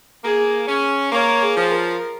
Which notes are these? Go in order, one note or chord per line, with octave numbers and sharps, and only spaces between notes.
A#3 G#4
C#4
A#3 C#5
G#4
F3
A#4